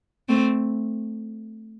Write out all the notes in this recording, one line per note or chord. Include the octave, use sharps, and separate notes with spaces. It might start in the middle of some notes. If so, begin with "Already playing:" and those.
A3 C4